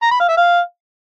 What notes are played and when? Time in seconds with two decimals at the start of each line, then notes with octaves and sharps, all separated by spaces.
0.03 A#5
0.11 B5
0.20 F5
0.29 E5
0.38 F5